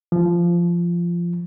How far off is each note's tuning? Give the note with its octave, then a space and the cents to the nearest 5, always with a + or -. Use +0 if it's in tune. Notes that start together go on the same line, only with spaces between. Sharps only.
F3 -15